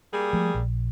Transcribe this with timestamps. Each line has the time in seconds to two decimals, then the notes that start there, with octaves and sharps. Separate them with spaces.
0.13 G3 A#3 G#4
0.33 F3 G#3 A3
0.54 A#1